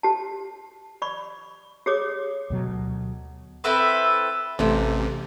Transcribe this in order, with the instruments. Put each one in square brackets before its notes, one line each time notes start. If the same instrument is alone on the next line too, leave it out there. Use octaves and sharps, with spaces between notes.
[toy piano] G4 A5
D5 B5 C#6
G4 G#4 C#5 D6 D#6
[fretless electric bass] D2 B2 F#3
[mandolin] C4 E4 A4 B4
[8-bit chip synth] A1 [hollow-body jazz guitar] C3 A3